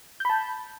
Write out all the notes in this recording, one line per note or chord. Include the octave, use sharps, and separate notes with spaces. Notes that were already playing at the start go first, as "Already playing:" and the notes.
A5 B5 G6